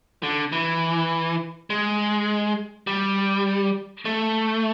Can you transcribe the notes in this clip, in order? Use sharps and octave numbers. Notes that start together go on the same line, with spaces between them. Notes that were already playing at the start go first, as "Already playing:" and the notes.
D3
E3
G#3
G3
A3